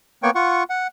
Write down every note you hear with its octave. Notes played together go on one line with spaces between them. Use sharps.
A#3 B3 C#5 G5 C#6
F4 F#5 C#6
F#5